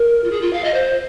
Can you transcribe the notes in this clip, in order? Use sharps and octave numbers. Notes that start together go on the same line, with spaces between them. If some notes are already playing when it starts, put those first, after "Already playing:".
Already playing: A#4
F4
G#4
F4
F5
D#5
C5